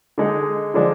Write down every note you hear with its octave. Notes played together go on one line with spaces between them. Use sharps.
D3 G#3 D#4
D3 F3 G#3 D4